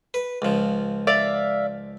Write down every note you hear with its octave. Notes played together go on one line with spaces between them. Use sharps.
B4
C#2 F3
D5 E5 F5